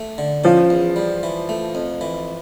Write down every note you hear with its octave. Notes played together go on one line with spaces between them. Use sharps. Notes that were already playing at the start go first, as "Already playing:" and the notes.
Already playing: A3
D3
F3 C#4
E2
G3
E3
A3
F2
E3